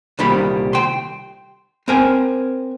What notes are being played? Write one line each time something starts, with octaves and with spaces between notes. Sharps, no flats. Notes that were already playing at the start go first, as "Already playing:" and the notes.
C2 A#2 D#3 G3 B5
G5 C6
C4 A#4 G#5